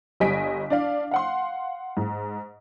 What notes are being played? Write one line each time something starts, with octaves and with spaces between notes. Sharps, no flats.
G1 G3 D#5 G#5 B6 D7
D4 D5 F5
F5 F#5 C6
G#2